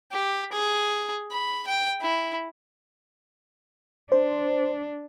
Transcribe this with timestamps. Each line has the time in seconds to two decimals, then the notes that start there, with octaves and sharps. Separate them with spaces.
0.12 G4
0.52 G#4
1.31 B5
1.67 G5
2.01 E4
4.12 D4 C5